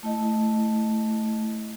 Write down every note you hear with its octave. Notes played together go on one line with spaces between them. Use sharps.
A3 E4 D#5